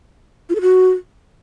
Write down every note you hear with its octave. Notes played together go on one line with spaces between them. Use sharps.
F4
A4
F#4